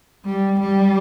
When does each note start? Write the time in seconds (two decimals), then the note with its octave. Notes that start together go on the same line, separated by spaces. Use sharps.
0.25 G3
0.60 G3